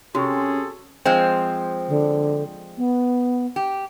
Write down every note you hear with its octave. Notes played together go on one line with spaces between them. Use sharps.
C3 C#4 F#4 G#4 A4 C#6
F3 G#3 C4
D3
B3
G4